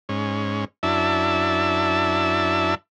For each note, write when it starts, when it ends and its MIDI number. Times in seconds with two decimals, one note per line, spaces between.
0.09 0.65 44
0.09 0.65 61
0.83 2.75 42
0.83 2.75 62
0.83 2.75 64
0.83 2.75 76
0.83 2.75 81